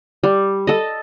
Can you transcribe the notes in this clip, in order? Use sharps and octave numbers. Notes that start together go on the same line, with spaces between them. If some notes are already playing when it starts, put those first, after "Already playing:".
G3
A4 D#5